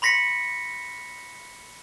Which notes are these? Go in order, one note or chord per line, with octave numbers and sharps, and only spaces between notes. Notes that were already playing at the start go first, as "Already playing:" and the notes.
B5 C6 A#6 B6 C#7